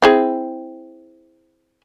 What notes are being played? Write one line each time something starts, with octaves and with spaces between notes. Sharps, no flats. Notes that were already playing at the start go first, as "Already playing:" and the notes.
C4 E4 G#4